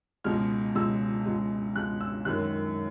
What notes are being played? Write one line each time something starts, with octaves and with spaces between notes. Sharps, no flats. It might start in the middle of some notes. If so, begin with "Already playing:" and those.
C#2 B2 G#3 F6
C#2 B2 G#3 E6
C#2 B2 G#3
C#2 B2 G#3 F#6
E6
F#2 D#3 G#3 F#6